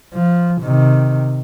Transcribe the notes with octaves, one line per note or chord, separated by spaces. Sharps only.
F3
C3 D#3